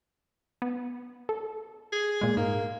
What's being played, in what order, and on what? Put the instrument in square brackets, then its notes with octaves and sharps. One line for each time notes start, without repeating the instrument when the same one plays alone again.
[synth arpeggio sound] B3
A4
[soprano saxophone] G#4
[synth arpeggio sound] A#2 G#3
[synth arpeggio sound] G#2 [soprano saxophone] A#3